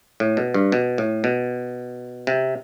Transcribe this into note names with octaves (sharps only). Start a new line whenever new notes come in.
A2
B2
G2
B2
A2
B2
C3